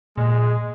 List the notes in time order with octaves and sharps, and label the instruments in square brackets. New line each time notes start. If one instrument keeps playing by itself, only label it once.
[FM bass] A#2 [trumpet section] G#3